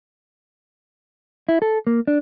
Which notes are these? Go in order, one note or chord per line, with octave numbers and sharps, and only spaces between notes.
E4
A4
A#3
D4